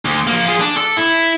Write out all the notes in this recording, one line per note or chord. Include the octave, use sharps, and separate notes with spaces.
D2
F3 A#3
F4 G#4
D4
A4
E4